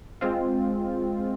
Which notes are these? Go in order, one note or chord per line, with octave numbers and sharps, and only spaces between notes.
G#3 C4 F4